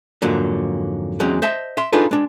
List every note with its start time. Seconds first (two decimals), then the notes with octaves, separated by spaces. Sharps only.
0.22 F2 G#2 D3 F#3 A#3
1.20 E2 F#3 G#3 C4 C#4
1.42 C5 D#5 E5 A5
1.77 E5 C6
1.93 D4 D#4 F4 G#4 A4 B4
2.11 G#3 D4